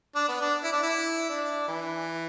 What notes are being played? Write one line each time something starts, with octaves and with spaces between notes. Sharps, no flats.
D4
B3
D4
E4
D4
E4
D4
E3